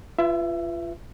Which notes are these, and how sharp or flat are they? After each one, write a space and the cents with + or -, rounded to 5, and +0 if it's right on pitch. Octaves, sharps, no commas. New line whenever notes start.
F4 -25 B4 +0 E5 +20